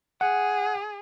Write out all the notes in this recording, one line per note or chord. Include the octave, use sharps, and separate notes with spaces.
G#4 F#5